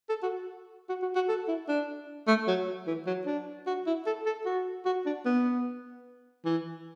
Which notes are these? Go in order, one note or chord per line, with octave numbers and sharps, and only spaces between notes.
A4
F#4
F#4
F#4
F#4
A4
E4
D4
A3
F#3
E3
F#3
D4
F#4
E4
A4
A4
F#4
F#4
D4
B3
E3